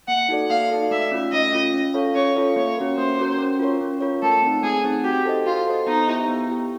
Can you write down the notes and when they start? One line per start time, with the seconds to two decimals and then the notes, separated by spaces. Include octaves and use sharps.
0.08 A#3 F#5
0.29 D#4 F#4 A4 D5
0.50 A#3 F5
0.70 D#4 F#4 A4 D5
0.91 A3 E5
1.11 C#4 F4
1.32 A3 D#5
1.52 C#4 F4
1.74 C#4
1.94 F4 A4 C#5 F5
2.15 C#4 C#5
2.36 F4 A4 C#5 F5
2.56 A#3 C#5
2.77 C#4 F#4 A#4
2.97 A#3 C5
3.18 C#4 F#4 A#4
3.38 C#4
3.60 F4 A#4 C#5
3.81 C#4
4.01 F4 A#4 C#5
4.22 A3 A4
4.42 C4 D#4
4.63 A3 G#4
4.84 C4 D#4
5.04 F#4 G4
5.25 A4 C5 D#5
5.46 F4 F#4
5.67 A4 C5 D#5
5.87 B3 D#4
6.07 E4 G4
6.28 B3
6.49 E4 G4